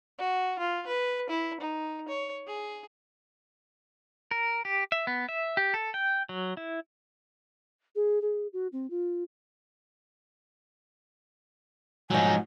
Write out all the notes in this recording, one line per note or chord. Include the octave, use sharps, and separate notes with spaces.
F#4
F4
B4
E4
D#4
C#5
G#4
A#4
G4
E5
B3
E5
G4
A4
G5
F#3
E4
G#4
G#4
F#4
C4
F4
G#2 F3 F#3 D#4 G#5